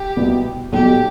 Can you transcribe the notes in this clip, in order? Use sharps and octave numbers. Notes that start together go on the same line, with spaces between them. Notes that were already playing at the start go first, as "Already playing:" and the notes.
Already playing: G4
C2 B2 B3
B1 B2 G3 G4